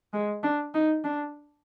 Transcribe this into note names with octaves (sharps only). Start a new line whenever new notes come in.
G#3
D4
D#4
D4